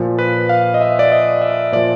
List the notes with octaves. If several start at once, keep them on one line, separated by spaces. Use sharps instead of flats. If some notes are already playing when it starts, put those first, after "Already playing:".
Already playing: A#2 F3
B4
F5
D#5
E5
D5
D#5
E5
A#2 F3 D5